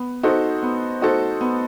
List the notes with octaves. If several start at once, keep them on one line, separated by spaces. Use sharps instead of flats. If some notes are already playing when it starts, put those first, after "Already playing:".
Already playing: B3
D#4 F#4 A4 C5
B3
D#4 F#4 A4 C5
B3